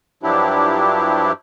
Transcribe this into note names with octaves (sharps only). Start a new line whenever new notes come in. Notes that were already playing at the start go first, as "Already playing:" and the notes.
G2 F3 F#3 D4 E4 G4